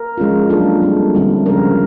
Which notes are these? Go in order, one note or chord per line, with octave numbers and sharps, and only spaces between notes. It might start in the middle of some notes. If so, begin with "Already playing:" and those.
Already playing: A#4
F3 G#3 C#4 F4
F#3 A#3 D4 F4 A4
G3 C4 E4
D3 G3 C4 E4
C#3 F3 G#3 C#4 F4 A#4